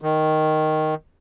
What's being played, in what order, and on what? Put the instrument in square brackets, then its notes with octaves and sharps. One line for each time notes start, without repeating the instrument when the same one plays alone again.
[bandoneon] D#3